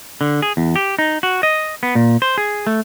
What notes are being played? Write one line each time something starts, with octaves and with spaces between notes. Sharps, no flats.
D3
G#4
E2
G4
D#4
F#4
D#5
B3
A#2
C5
G#4
A3